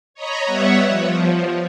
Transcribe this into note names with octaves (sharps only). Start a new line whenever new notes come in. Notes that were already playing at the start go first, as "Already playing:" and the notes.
C#5 D#5 A#5 B5
G3 B3 C#5 E5 F#5
F3